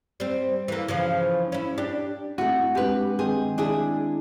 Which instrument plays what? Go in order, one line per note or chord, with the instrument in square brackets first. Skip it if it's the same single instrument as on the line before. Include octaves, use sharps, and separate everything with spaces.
[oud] G3 C4
E3 A#3
C#3 E3 F3
C#4 E4
D4 G4
[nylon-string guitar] A3 E4 [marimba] C4 [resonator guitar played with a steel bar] F#4
[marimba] G#3 C4 D4 [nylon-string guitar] G4 B4
[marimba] D#3 C4 G5 [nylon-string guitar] G#4
[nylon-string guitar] D4 E4 G#4